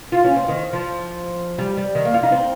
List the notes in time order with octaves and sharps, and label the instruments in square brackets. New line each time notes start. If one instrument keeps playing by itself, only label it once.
[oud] F4
C#4
C4
D#3
F3
G3
G3
D#3
A#3
F4
D#4
C4